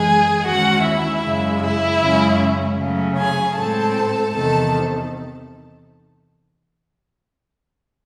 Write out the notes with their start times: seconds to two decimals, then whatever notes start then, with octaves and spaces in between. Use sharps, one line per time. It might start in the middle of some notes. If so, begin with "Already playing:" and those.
Already playing: F#2 E3 G#3 G#4 G#5
0.45 D#2 D#3 G#3 C#4 F#4 F#5
0.84 E4 E5
1.24 F#2 C#3 G#3
1.62 E4 E5
2.01 F#2 C#3 G#3 C#4
2.79 C#3 F#3 A3 C#4
3.18 G#4 G#5
3.57 A2 G#3 C4 A4 A5
4.35 E2 C3 D#3 A4 A5